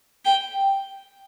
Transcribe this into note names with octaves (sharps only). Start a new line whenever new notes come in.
G5